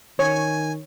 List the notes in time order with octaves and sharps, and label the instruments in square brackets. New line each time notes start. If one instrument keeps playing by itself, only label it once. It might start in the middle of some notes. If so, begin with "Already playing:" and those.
[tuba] D#3 [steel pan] C#5 [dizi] G#5